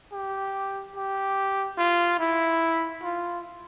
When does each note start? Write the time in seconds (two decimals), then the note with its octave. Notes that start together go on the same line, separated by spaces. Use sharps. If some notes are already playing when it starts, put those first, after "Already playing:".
0.12 G4
0.96 G4
1.78 F4
2.19 E4
3.03 F4